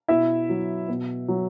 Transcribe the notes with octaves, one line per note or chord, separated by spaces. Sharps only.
B2 E4 E5
F#3
B2
F#3